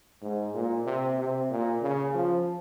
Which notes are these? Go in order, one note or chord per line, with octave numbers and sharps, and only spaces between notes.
G#2
A#2
C3
C3
A#2
C#3
F3